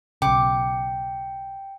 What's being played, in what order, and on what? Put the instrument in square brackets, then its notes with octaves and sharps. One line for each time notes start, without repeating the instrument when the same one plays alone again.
[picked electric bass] B1 C#3 [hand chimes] G5 [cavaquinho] D6